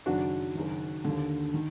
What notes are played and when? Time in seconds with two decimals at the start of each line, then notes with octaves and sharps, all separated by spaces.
0.06 F#1 F#2 D#3 D4 F#4
0.55 F#1 F#2 D#3
1.04 D#2 D3
1.54 D#3